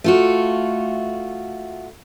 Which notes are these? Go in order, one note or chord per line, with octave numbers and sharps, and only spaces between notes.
A3 F4 F#4